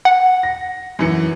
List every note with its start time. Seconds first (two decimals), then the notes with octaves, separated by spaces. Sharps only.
0.05 F#5
0.43 A#6
0.99 F#2 E3 C#7